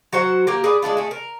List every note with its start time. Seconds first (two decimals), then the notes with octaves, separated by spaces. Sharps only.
0.13 F#3 F#4 C5 F#5
0.47 A#3 G4 A#4
0.64 G#4 B4 D5
0.82 G#3 C4 D4 F4
0.97 A3 G#4
1.11 A#4